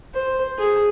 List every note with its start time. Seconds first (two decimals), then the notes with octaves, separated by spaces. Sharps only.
0.14 C5
0.59 G#4